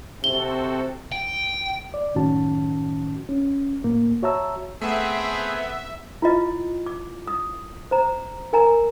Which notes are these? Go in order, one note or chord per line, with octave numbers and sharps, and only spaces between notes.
C3 C4 F#4 A4 G7
G5
D5
F#2 A2 D#3 C#4 F#4 A5
C#4
A2 A#3
F#4 C#5 E5 A5 A#5 E6
A3 B3 C4 G#4 E5
E4 F4 D#5
D6
D#6
C5 A#5
A#4 G#5 A#5